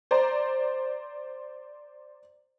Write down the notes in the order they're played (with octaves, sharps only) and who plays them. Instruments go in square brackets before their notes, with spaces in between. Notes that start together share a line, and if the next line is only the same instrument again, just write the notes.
[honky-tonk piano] C5 D5 A#5